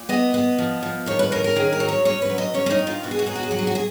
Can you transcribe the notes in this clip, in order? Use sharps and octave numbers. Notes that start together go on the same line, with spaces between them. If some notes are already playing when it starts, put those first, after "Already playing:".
Already playing: A#2
B3 D#5
B3
F3
F3
D#3 C#5
B4
C#4 A#4
A#4
D#3 G#4
A#4
F#3
C#5
C#4 C#5
B4
F#3
D#5
C#4 C#5
C#4
D#4
D#3
F4
B2 F#4
G#4
F#4
F#3 G#4
F#4
G#4
F#3 F#4
G#4
F#4
G#4